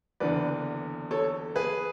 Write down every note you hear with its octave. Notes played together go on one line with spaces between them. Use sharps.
F#1 E2 D3 B4 D5
A4 C#5
G#4 B4